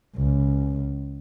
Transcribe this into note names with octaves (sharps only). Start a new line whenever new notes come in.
C#2